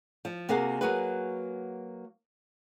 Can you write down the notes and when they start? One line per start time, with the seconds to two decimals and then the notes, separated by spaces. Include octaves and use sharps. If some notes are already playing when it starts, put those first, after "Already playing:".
0.25 F3
0.49 C3 A#3 F#4 G#4 F5 F#5
0.81 F#3 A#3 F#4 G#4 B4